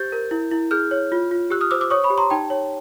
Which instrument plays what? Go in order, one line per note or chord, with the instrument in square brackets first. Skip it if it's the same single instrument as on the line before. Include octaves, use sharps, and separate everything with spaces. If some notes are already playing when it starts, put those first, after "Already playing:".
Already playing: [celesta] G4 C5 G6 A6
A#4
E4
E4
G#4 F6 G6
C#5
F4
F4
G4 E6 F#6
D#6 F6
C5 D6 E6
D6 E6
C#5 C#6 D#6
B5 C#6
G4
A#5 C6
D#4 G5 A5
C#5